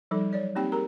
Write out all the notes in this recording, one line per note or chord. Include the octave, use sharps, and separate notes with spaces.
F3 G3 D#4 A4
F#3 C#5 D5
A#3 C4 D#4 G4 G5
G4 G#4 A#4 A#5